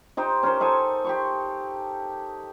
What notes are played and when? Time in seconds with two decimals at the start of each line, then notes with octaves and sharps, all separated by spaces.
0.17 D#4 G4 C5
0.43 C#4 A#4 C5
0.60 D#4 A4 C5 G#5
1.05 G4 C6 C#6